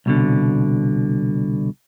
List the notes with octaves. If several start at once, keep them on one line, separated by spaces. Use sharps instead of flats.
C2 B2 D3